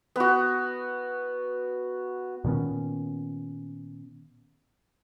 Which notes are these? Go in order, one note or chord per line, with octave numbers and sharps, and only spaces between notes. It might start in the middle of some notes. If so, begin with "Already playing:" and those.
B3 F#4
A#2 D#3 B3 C#4